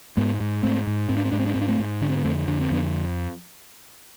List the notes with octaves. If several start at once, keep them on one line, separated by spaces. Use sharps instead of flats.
G#2 G#3 B3
G#2
G#2 A3 C4
G#2
G#2 C4
D4
C4
G#2 D4
C4
D4
G#2 C4
D4
A3 C4
G#2
D3 D4
C4
B3
F2 A3 C4
D3 D4
C4
F2 B3 D4